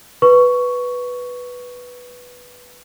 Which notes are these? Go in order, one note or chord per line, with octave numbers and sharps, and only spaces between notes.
B4 C#6